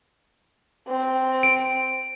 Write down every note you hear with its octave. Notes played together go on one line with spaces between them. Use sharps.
C4
D7